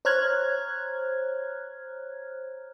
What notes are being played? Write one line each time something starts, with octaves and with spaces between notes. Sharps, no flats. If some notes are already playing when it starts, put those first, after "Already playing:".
C5 C#5 A#5 F6 F#6 G#6